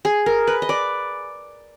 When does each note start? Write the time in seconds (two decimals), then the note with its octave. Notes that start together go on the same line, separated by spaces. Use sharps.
0.05 G#4
0.26 A#4
0.47 B4
0.62 D#5
0.69 D5